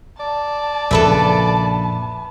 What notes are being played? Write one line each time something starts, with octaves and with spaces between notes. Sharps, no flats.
D5 A5
A#1 F#2 C#3 A4 B4 E5